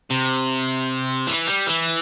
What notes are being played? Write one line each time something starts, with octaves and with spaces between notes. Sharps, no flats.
C3
E3
G3
E3